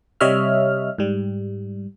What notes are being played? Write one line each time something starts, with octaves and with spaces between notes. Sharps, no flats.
C3 G3 C#5 D#5 E5 F6
G#2 G3